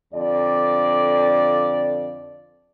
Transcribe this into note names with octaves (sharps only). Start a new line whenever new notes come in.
F2 D3 D5